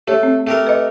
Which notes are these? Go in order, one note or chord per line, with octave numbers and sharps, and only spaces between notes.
A3 G4 C#5
C4
A3 G4 A#4
B4 D#5